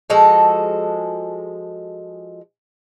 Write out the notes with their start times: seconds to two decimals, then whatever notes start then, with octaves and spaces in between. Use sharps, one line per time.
0.10 F3 G#3 F#4 A4